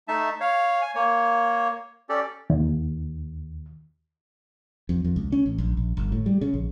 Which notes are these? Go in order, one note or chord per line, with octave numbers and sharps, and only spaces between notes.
A3 D#4 E5 A5
C#5 F5
G#5
A#3 C#5
C#4 G4 A4 D5
D#2
F2
F2
C#2
C#4
A1
A#1
A#1
G1
A2
G3
C#3
A#1